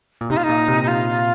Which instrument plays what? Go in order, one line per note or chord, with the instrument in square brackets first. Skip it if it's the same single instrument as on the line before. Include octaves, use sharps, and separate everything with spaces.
[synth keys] A#2
[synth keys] C3 [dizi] D#4
[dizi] F4
D#4
[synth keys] A#2
C3
[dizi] D#4
F4